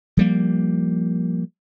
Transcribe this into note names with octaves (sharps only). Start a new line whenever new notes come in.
F3 G3 A#3